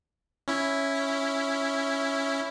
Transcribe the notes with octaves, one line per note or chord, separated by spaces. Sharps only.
C#4 E4